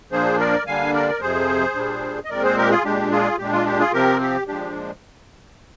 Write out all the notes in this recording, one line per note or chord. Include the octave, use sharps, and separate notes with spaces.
A#2 F3 A#3 D4 G#4 C5
A#4 D5
D3 G3 A#3 D4 F5 G#5
A#4 D5
A#4
F2 C3 F3 G#4 C5
A#2 G3 D4
D#5
A#2 G#3 C4 A#4 D5
G#4 C5
G4 A#4
F4 G#4
A#2 G#3 D4 G4
F4 G#4
A#2 G#3 D4 G4
F4
G4
F4 G#4
C3 F3 C4 G4 A#4
G4
A#2 F3 G#3 D4 G4